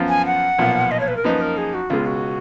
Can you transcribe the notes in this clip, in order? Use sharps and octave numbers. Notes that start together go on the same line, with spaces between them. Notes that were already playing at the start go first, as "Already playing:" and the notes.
Already playing: F#2 F3 B3 F4
G#5
F#5
B1 A#2 F3 B3 F4
D#5
C#5
B4
A#4
F#2 F3 A#3 D#4 B4
A#4
G#4
F#4
C#2 B2 G#3 F4
F#4